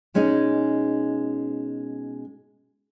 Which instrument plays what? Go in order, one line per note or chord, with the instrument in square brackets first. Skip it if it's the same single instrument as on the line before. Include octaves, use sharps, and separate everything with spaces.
[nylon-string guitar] B2 G#3 C#4 D#4 G#4